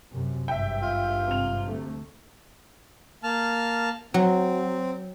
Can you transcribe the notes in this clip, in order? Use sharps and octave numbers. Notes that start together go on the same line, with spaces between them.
F#2 C3
G#1 G2 E5 G5
F4
C3 F7
D2 A3
A#3 A5 F6
F#3 C4